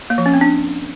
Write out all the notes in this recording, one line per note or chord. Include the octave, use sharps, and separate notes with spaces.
A#3
F3
C#4
C4
D4